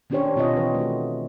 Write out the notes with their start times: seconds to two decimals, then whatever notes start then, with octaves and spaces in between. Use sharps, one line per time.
0.10 D#3 C#4 D4 G4 C5 C#5
0.36 B2 C4 F4 C#5 D#5
0.56 D#3 E3 B4
0.75 A3 F#4